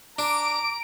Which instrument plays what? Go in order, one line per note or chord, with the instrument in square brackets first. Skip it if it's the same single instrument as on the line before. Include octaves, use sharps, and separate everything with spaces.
[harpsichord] D4 [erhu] A#5 [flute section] D6 [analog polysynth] D7